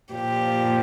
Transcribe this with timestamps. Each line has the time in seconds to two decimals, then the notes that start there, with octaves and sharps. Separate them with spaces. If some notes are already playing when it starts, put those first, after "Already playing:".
0.14 A#2 F3 G4